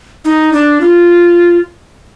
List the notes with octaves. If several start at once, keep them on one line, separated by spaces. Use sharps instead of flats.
D#4
D4
F4